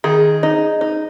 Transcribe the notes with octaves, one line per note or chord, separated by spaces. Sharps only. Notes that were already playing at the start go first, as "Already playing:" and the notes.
D#3 G#4
D#4
D#4